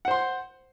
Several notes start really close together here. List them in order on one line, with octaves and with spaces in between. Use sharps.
F#5 C5 C6